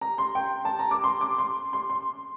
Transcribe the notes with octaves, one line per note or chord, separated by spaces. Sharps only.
A#5
C6
G5
A5
A#5
D6
C6
D6
C6
C6
C6